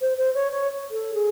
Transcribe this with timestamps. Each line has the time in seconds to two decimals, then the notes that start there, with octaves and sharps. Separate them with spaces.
0.01 C5
0.18 C5
0.35 C#5
0.52 C#5
0.91 A4
1.14 G#4